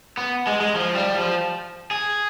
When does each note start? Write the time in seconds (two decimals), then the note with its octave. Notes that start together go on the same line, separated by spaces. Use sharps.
0.17 B3
0.47 G#3
0.61 G#3
0.76 F3
0.95 G3
1.14 F3
1.91 G#4